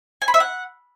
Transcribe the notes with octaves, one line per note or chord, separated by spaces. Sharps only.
G#5
B5
E5
F#5